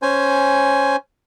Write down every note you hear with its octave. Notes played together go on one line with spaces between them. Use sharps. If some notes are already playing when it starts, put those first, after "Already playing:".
C#4 C5 G#5